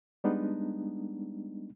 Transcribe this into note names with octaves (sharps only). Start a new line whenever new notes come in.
G3 G#3 B3 D4 D#4